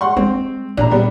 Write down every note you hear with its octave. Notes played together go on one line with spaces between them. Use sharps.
F#5 C6 C#6
G#3 C4
A#2 D4 A#5
G3 B3 D4